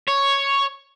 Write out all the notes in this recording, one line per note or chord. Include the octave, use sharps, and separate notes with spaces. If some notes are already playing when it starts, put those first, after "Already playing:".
C#5